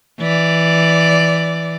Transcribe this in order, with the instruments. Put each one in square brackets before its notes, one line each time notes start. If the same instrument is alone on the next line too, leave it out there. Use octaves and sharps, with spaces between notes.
[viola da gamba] E3 D5